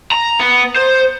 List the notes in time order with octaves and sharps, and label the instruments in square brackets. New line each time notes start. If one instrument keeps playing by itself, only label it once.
[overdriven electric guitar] A#5
B3
C5